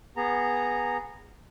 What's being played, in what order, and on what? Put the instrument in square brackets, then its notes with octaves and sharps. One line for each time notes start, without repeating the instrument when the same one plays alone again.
[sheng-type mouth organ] B3 G#4 A#5